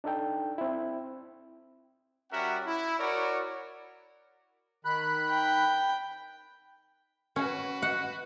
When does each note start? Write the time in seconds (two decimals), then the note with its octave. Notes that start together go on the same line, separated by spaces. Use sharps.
0.04 D4 D#4 A4 G5
0.58 C4 E4
2.31 G3 C#4 F#4 A#4 E5 F#5
2.66 E4
2.99 F#4 A#4 C#5 D5
4.85 D#3 B5 F#6
5.30 G5
7.36 C#4 F#4 B4
7.82 F#5